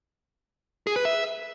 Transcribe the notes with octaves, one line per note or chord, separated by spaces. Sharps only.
G#4
B4
E5